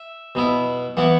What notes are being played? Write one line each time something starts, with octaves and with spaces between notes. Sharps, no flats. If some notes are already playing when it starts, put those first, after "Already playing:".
Already playing: E5
B2 B3 E4
E3 B3 E4 F#5